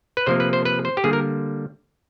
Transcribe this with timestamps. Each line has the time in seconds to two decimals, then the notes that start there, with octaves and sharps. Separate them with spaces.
0.17 B4
0.26 C3 F3 A#3 C5
0.40 B4
0.53 C5
0.65 B4
0.85 C5
0.97 G4
1.04 D3 G3 A#3 G#4
1.13 A#4